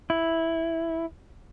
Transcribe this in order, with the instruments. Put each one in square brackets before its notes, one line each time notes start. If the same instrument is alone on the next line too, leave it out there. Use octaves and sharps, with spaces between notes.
[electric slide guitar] E4